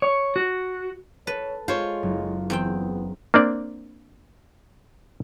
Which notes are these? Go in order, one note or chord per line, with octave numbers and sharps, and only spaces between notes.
C#5
F#4
A4 B4 C#5
G#3 F4 C5 C#5
F#1
E2 B3 C4 G5
A#3 C4 D4 D5